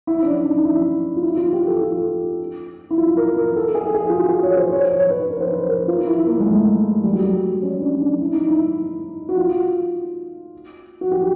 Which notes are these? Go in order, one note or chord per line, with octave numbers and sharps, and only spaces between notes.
E4
C#4
D4
D#4
E4
F4
E4
F4
G4
A4
F4
E4
F4
A#4
A#4
A4
G#4
G#4
F4
F#4
G#4
C#5
C5
C#5
C#5
B4
A#4
C5
B4
A#4
F4
E4
A#3
G#3
A3
G3
F#3
G3
C#4
D4
D4
E4
D#4
E4
F#4
F4
F#4
G4